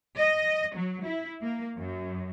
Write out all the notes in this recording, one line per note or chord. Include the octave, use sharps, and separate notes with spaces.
D#5
F#3
E4
A#3
F#2